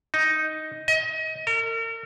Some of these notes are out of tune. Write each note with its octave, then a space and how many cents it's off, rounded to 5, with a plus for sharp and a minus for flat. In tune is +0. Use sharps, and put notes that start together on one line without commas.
D#4 +5
D#5 +30
A#4 -40